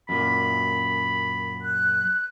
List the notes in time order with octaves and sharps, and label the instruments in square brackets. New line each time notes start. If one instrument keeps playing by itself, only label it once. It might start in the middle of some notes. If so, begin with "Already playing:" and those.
[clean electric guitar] F#2 A#2 [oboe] B5
[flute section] F#6